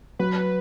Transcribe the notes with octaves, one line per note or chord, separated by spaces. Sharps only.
F#3 B4